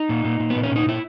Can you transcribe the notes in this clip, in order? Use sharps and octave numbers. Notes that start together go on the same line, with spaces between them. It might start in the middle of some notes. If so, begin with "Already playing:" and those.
Already playing: D#4
A#2
A#2
A#2
B3
A#2
C#4
A#2 D#4
A#2 E4